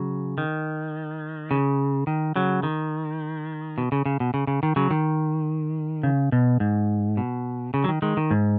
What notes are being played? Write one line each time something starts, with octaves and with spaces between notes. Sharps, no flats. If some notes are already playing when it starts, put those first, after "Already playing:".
Already playing: C#3 F#3
D#3
C#3
D#3
C#3 F#3
D#3
B2
C#3
C#3
B2
C#3
C#3
D#3
C#3 F#3
D#3
C#3
B2
G#2
B2
C#3
F#3
D#3
D#3 G#3
D#3
G#2